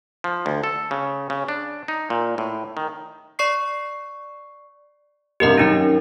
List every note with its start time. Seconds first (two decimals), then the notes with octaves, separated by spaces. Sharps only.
0.24 F3
0.46 D2
0.64 A4
0.91 C#3
1.30 C#3
1.48 D4
1.88 D#4
2.10 A#2
2.38 A2
2.77 D#3
3.39 D5 C#6 C7
5.40 F1 C2 G2 G4 A#4 D#5
5.58 F#2 D#3 C#4 D#4 A#4